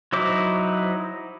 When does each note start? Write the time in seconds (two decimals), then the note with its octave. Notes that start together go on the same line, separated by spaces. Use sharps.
0.13 F#3 D#4 E4 C5 D6